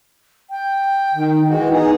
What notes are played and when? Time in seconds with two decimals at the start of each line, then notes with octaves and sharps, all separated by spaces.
0.50 G5
1.14 D#3
1.48 E3 G#3 F#4
1.71 B3 D#4 G#4